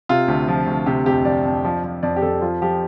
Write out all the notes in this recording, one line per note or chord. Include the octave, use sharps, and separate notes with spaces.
C3 F4
D2
F3
D2
C3 G4
F2 G4
F3 D5
F2
F3
F3
F2 D5
G4
F2 A4
F3 F4
F3 G4